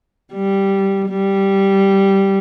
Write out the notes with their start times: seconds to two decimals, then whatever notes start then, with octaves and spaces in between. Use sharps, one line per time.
0.33 G3
1.09 G3